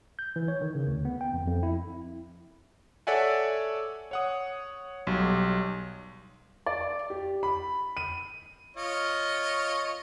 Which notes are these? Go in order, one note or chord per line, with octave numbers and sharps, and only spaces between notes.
G6
E3
C#5
D#3
C#3
D2
B3
G5
F2
F2
E4
A4 C#5 D5 E5 F#5 G#5
C#5 F#5 D#6
B1 F#3 G3
D5
G4
B5
D#7
F4 C#5 D#5